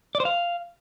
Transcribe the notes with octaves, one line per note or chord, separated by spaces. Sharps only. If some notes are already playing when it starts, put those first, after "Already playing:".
D5
C5
F5